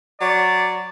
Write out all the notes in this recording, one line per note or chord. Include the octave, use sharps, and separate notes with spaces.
F#3 D5